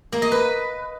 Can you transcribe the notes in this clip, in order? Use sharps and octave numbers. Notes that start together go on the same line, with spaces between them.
A#3
D#5
B4